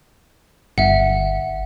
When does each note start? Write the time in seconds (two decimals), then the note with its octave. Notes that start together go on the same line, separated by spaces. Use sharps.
0.78 G1 E5 F#5